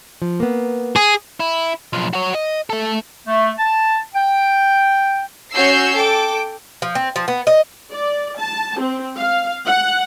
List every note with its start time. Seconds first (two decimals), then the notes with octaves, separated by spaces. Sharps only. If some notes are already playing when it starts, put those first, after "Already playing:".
0.22 F3
0.40 A#3 B3
0.96 G#4
1.40 E4
1.93 B1 F3
2.13 F#4 C#5
2.35 D#5
2.70 A3 A4
3.27 A3
3.58 A5
4.15 G5
5.53 C#4 F#4 C#5 E6 G6 C7
5.95 A4 G5 D6
6.82 F3
6.95 C4
7.16 F3
7.28 B3
7.47 D#5
7.92 D5
8.37 A5
8.80 C4
9.18 F5
9.66 F#5